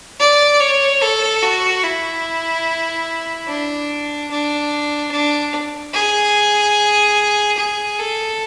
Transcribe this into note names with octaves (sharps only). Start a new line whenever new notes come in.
D5
C#5
A4
F#4
E4
D4
D4
D4
G#4
G#4
A4